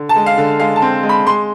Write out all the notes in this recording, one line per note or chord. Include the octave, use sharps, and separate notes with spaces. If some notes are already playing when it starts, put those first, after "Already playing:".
Already playing: D3
A5
G#3
F5
D3
G#3 F5
A5
C4
G#3
B5
G#3 C6